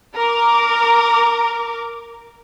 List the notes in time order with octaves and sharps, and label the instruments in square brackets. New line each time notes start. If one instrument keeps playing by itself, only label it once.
[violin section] A#4 D6